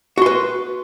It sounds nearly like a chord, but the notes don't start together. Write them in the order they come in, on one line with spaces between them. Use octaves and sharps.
F#4 C6 B4